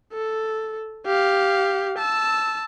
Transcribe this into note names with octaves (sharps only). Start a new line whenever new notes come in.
A4
G4 F5
A5 E6